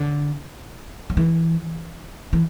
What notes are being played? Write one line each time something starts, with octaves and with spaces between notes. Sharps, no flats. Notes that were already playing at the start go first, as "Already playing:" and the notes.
Already playing: D3
F#3
E3
E3